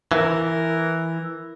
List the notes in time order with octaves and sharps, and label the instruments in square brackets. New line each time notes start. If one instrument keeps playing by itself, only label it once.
[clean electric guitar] E3 [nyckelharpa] A#4